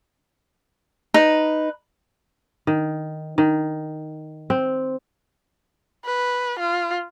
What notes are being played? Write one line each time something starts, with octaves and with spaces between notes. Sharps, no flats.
D#4 B4
D#3
D#3
C4
B4
F4